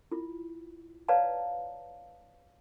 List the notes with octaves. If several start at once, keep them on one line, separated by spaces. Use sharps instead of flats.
E4 F4
B4 C#5 D5 F5 A5 A#5